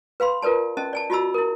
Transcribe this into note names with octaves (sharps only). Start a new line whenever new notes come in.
B4 F5 B5 C6
F4 A#4 B4 D5 A5
C#4 D#5 A5
D5 G#5 A5
F4 F#4 D#5 A5 B5 E6
E4 A#4